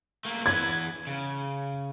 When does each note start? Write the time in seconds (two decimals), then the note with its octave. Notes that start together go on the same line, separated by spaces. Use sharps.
0.25 A3 A#3
0.46 E3 B3 G#6
1.07 C#3